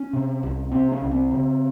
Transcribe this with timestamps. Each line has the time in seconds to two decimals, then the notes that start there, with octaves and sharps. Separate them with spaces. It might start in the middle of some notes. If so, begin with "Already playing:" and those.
Already playing: C#4
0.13 C3
0.43 C2
0.72 C3 C4
0.92 C#4
1.02 C2
1.11 C4
1.31 C#3